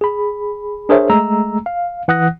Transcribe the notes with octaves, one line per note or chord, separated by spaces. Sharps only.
G#4 B5
D4 G#4 A#4 C5 C#5 E5
G#3 A3 A#5 E6
F5
E3 F#5 D#6 F#6 A#6